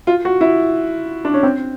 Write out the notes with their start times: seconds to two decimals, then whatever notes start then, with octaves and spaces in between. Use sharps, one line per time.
0.07 F4
0.25 F#4
0.41 E4
1.25 D4
1.34 C#4
1.43 C4